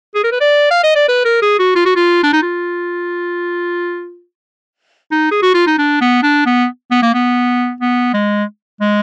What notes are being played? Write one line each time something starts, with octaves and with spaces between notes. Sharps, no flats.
G#4
A#4
B4
D5
F5
D#5
D5
B4
A#4
G#4
F#4
F4
F#4
F4
D4
D#4
F4
D#4
G#4
F#4
F4
D#4
D4
B3
D4
B3
B3
A#3
B3
B3
G#3
G#3